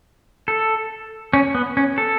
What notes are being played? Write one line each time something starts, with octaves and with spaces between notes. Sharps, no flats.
A4
C#4
B3
C#4
A4